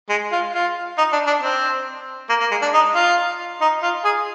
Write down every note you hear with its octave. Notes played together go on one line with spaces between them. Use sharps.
G#3
F4
F4
D#4
D4
D4
C4
A#3
A#3
G#3
D4
D#4
F4
D#4
F4
G#4